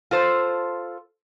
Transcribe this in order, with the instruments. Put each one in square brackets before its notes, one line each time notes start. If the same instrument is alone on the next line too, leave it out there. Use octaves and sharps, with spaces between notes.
[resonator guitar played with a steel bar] F4 A4 C5